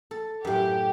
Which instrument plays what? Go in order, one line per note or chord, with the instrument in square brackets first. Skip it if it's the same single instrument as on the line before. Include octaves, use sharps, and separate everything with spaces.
[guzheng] A4
[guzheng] F#2 A2 [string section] G4